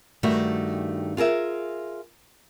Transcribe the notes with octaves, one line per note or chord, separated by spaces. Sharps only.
G2 D#3 G3 A3 F#4
F4 G#4 A#4 E5